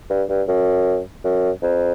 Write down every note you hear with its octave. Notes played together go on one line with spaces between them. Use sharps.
G2
G2
F#2
F#2
F2